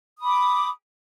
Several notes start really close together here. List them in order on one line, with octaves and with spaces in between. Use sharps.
D#6 B5 D6